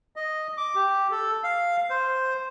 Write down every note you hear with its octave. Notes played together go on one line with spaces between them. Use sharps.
D#5
D6
G4
A4
F5
C5